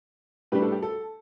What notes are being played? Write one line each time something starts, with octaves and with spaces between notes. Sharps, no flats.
A2 G3 D4 G4 B4
A4
G4
A4